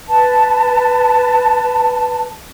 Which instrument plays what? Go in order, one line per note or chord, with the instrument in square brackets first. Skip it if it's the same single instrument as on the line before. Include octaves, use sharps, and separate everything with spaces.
[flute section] B4 A5